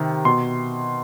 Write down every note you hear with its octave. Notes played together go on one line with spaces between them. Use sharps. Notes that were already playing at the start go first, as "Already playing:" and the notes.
Already playing: C3 D#3
B2 C6